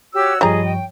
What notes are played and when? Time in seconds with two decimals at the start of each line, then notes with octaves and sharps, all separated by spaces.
0.14 F#4 G4 C#5 E6
0.41 G2 F3 G3 G#4 C#5 D#5 A#5
0.64 G5